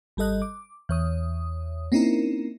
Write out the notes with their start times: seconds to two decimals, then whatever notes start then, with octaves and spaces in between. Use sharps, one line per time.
0.17 G#1 G3 A4 D#5 F#6
0.42 D6
0.89 E2 C#5 D#6
1.92 A#3 C4 C#4 D#4 E4 A#4